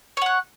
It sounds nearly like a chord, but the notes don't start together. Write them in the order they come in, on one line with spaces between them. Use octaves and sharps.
C#5 F#5 F#6